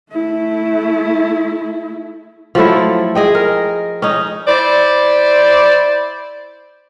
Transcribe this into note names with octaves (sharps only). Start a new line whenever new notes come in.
A3 E4
F3 F#3 A3 E4
G#4 D#5 G5
A#4
C#4 D#4
E4 C5 D5